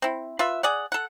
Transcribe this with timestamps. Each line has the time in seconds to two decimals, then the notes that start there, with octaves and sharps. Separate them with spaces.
0.02 C4 E4
0.39 F4 B4 E5
0.63 G#4 D5 F#5
0.92 A4 F#5